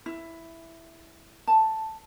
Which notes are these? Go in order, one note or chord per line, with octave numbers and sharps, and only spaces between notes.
E4
A5